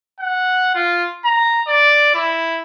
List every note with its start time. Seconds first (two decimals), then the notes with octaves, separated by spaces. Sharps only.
0.20 F#5
0.75 F4
1.25 A#5
1.67 D5
2.15 E4